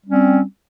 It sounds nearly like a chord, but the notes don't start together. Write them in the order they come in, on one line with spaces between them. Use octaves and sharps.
G3 C#4 C4